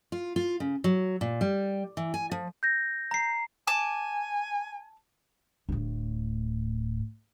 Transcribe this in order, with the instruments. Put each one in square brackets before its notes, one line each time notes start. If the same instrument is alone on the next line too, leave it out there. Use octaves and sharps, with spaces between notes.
[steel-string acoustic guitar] F4
F4
C#3
F#3
A#2
G3
E3
G#5
F3
[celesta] G6 A#6
[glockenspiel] A#5 C7
[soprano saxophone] G#5 [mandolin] A5 D6
[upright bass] D1 A2